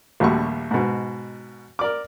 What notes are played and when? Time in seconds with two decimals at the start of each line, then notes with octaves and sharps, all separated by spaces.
0.20 A#1 D#2 G3 A3 F#4 C#6
0.71 G#2 B2
1.79 A#4 D5 D6